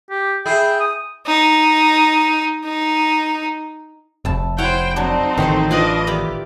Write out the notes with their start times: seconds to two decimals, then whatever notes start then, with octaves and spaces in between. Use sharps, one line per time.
0.10 G4
0.45 E4 G#4 G5
0.80 D#6
1.27 D#4
2.65 D#4
4.25 F1 E4 A5
4.58 E4 F#4 C5 C#5 F#5 G5
4.96 F#3 C4 D4 D#4
5.38 A1 D#3 A4 C5
5.71 D4 F4 B4 D5 D#5
6.07 D#3 E4 G4 D5